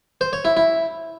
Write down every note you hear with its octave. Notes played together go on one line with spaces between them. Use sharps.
C5
C#5
E4
E4